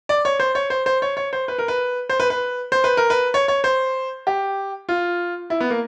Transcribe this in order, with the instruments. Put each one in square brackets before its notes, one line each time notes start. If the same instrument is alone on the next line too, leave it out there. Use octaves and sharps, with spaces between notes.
[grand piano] D5
C#5
C5
C#5
C5
C5
C#5
C#5
C5
B4
A#4
B4
C5
B4
B4
C5
B4
A#4
B4
C#5
C#5
C5
G4
F4
E4
B3
A#3